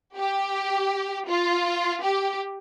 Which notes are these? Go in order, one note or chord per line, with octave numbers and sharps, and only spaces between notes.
G4
F4
G4